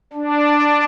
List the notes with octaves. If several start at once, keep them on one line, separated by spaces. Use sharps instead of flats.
D4